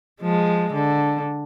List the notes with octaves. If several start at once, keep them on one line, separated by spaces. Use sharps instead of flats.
F3 G#3
D3